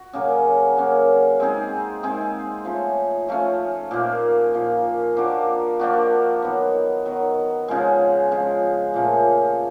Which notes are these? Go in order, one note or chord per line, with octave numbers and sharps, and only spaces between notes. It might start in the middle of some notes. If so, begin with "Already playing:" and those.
Already playing: F#4
C#3 F#3 A#3 C#4
C#3 F#3 A#3 C#4
G#3 C4 D#4 G#4
G#3 C4 D#4 G#4
F3 A3 C#4
F3 A3 C#4
A#2 F3 A#3
A#2 F3 A#3
F3 A#3 D4 F#4
F3 A#3 D4 F#4
D#3 F#3 B3
D#3 F#3 B3
C#3 F3 G#3
C#3 F3 G#3
A#2 F3 A3 C#4